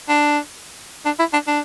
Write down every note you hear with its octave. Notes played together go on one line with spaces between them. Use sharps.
D4
D4
E4
D4
D4